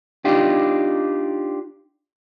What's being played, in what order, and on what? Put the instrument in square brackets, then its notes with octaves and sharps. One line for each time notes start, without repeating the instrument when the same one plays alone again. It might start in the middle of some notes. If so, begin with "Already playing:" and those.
[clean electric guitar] D4 D#4 F4 G4